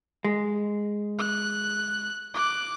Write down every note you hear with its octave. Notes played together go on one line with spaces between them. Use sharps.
G#3
F#6
D6 F#6